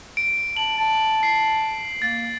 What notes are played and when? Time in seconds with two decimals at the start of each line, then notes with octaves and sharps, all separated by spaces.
0.17 D7
0.57 A5 F#7
0.78 A5
1.23 C7
2.02 A#3 A6